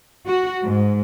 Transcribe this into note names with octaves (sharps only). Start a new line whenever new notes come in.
F#4
G#2